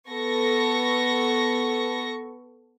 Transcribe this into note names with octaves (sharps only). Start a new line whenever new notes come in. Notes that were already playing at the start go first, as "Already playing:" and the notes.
B3 A4 C#6 A#6